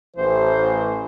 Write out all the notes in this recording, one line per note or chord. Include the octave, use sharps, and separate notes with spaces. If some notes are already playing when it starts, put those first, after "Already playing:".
A1 E3 C5